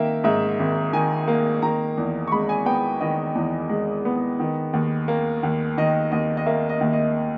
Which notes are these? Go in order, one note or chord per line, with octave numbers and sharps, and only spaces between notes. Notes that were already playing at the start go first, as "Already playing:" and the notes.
Already playing: D#3 A#3 E5 G5
G#2 E5
G#1
D#3 G#5
A#3
D#3 A#5
E2
C#6
G#3 B5
G#5
B3 G5
D#3 D#5
E2
G#3
B3
D#3
D#2
A#3
D#2
D#3 D#5
D#2 D#5
D#5
A#3 E5
D#5
D#2
D#5